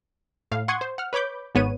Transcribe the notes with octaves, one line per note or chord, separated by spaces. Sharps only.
A2 F5
F#5 C6 C#6 D#6 G#6
C5
F#5 F6
B4 C#5 B5 D6 G6
G#1 G#2 B3 C#5 D#7